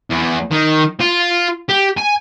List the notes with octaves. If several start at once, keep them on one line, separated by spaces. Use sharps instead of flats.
E2
D#3
F4
G4
G#5